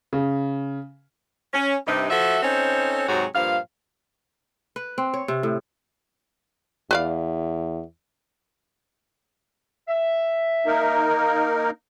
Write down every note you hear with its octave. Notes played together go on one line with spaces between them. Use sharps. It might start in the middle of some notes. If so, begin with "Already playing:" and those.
C#3
C#4
G2 C3 D#4
F3 F#4 A4 E5
C4 C#4 D#4 A4 C5 C#5
G#2 C3 F#3 F#4 G#4 C#5
G2 A#2 F3 F5
B4
C4
C#5
C3
A2
E2 B4 D5 F5
E5
A#3 D#4 A#4